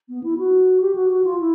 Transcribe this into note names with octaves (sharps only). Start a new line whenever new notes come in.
B3
E4
F#4
G4
F#4
F#4
F4
E4